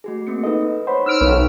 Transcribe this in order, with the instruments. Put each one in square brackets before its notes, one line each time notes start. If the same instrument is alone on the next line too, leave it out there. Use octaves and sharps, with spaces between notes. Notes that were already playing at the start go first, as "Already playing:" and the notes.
[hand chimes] A3 F#4 G#4
A#3 C4 C#7
[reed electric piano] D#4 D#5 [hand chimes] A4 B4
[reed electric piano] C5 C#5 B5 [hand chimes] F#5
[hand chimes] D#4 [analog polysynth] E6 F6 D7
[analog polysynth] B1 [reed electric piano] A4 B4 C#5